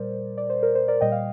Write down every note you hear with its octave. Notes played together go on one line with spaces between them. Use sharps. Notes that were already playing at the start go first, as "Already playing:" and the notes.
Already playing: A#2 G3 A#4 C5 D5
D5
C5
A#4
C5
A#4 D5
A#2 G3 D#5 G5
F5